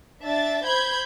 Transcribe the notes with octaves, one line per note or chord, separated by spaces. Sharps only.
D4 E5 A6
C5 B5 G6 G#6